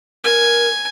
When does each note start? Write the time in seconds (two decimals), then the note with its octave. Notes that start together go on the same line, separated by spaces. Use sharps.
0.24 A#4 G#5